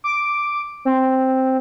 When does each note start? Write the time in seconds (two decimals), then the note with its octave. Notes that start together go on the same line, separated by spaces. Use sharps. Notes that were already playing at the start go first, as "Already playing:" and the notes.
0.04 D6
0.85 C4